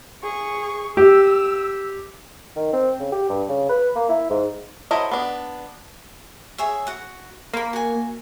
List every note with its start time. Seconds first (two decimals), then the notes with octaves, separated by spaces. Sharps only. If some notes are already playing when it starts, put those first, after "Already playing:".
0.23 G#4 C#6
0.97 G4 E6
2.56 D#3
2.73 C4
3.00 C#3
3.12 G4
3.29 G2
3.49 C#3
3.69 B4
3.96 A#3
4.09 E4
4.30 G#2
4.91 F#3 E4 A4 C5 D#5
5.11 B3 D4
6.58 G#4 C#5 E5
6.87 F#4 F#5
7.53 A#3 B5 C6
7.73 F#4 G#5